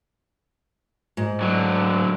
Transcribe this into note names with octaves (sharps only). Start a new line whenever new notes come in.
G#2
D3 F#3